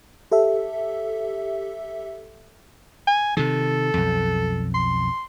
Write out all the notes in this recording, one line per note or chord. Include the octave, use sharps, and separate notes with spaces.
G4 A4 E5
G#5
C3 D#3 A4
B1 F2
C6